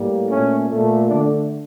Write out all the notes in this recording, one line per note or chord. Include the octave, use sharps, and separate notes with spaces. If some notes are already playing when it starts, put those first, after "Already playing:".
Already playing: A2 G3 A#3
A#2 A3 C#4
A#2 A3
D3 A3 D4